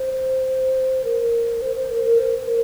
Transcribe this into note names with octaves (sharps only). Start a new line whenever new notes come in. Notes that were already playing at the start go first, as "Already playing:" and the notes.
Already playing: C5
A#4
C5
C5
A#4
A#4
C5
A#4